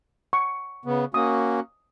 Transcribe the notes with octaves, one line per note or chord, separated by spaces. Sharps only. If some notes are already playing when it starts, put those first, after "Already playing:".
C#6
C#3 B3
A#3 C#4 F#4 D#6